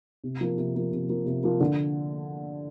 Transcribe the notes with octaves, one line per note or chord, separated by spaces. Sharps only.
C3
F3 A#3
C3
F3 A#3
C3
F3 A#3
C3
F3 A#3
D3